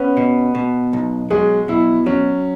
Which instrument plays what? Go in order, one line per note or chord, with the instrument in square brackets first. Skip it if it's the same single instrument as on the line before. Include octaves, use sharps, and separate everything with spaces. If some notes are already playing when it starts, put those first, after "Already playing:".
Already playing: [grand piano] B3 B4 [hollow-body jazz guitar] C#4
[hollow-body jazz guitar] B2
B2
B1
[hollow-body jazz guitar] F#3 [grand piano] G#3 G#4
[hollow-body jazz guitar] B2 [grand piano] E4
[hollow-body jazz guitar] F#3 [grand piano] C#4